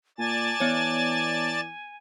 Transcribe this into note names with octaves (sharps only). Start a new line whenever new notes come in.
A#2 D5 G#5 A5 A6
E3 B3 C#5